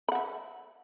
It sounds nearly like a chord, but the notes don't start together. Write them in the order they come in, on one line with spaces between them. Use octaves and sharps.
B5 F#5 E5